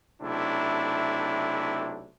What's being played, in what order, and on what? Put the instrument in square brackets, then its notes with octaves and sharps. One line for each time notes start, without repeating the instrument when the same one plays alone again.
[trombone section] B1 C3 A3 D4 E4